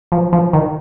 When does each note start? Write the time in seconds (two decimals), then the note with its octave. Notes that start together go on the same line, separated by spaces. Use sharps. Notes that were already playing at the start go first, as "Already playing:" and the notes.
0.12 F3
0.33 F3
0.53 D#3